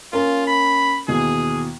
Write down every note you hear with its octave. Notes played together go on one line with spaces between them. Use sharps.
A#3 C#4 F4 A#4
B5
D#2 B2 E3 G#4